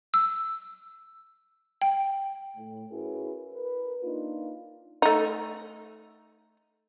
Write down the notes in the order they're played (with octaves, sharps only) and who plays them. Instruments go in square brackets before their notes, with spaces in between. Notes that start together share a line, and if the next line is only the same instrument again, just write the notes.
[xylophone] E6
G5
[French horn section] A2
C#4 E4 F#4 G#4 A#4 B4
A#4 B4
A#3 D4 D#4 F4
[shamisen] A3 D#4